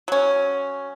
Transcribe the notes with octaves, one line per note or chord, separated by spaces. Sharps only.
F#3 C#4